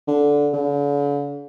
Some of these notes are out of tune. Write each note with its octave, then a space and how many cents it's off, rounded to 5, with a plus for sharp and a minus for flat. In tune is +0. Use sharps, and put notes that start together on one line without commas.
D3 -10
D3 -45